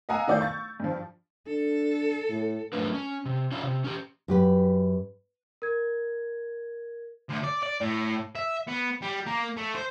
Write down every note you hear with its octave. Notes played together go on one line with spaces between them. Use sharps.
D#5 F5 F#5 G#5 A#5 E6
D#3 A3 D5 F5 G6
C#6 A6
G2 F3
D4 A4
A2
F3 F#3 A3 A#3 D4 B4
C#4
C3
C#4 D4 F4 C#5 E5
C3
C#4 G4
F#2 G4 B4
A#4 G#6
D2
D5
D5
A2
E5
B3
G3
A#3
A3
C5